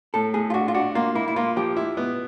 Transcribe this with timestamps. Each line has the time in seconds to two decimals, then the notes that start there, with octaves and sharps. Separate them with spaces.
0.14 A2 A4
0.34 A2 G#4
0.50 F4
0.54 D4 F#4
0.68 F4
0.74 D4 F#4
0.95 A#3 F4
1.15 A#3 E4
1.28 E4
1.36 A#3 F4
1.56 F3 G4
1.76 E4
1.97 B3